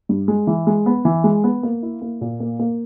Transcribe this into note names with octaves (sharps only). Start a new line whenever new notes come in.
G2
G#3
E3
G#3
B3
E3
G#3
B3
A#3
E4
A#3
A#2
A#3
A#3